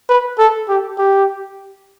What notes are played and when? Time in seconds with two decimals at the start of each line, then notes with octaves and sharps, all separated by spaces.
0.09 B4
0.39 A4
0.69 G4
0.98 G4